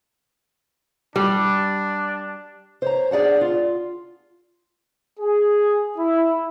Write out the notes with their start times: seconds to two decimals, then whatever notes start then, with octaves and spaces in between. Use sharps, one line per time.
1.16 G3 D4
2.82 C5 C#5 A#5
3.11 D4 G#4 D5 F#5 A5
3.41 F4
5.20 G#4
5.98 E4